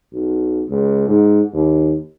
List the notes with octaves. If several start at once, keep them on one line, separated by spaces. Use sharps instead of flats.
B1
C#2
G#2
D#2